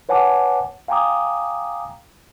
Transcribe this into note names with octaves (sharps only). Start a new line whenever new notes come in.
B4 C#5 F#5 G#5 A5 D6
F5 G5 G#5 A#5 D6 D#6